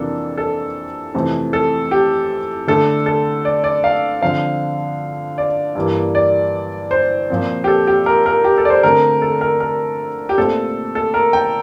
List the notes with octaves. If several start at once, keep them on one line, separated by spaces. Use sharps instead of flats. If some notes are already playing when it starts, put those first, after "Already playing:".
Already playing: F2 C3 E3 A#3 D4 A4
A4
F2 C3 E3 A3 C4
A4
G4
D3 A3 D4 A4
A4
D5
D5
F5
D3 F3 C4 F5
D5
G2 E3 G3 A#3
D5
C5
A#2 F3 C4
G4
A4
G4
A#4
A#4
G4
A4
D5
C5
D3 A3 C4 A#4
A4
A#4
A#4
G4
A#2 A3 C4 A4
A4
A#4
G5